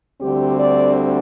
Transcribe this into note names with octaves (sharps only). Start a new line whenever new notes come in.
D2 D3 G3 C4 G4
D5